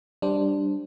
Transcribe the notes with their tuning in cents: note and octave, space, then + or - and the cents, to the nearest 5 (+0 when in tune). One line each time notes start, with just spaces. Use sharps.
G3 +0 D4 +0 C5 +0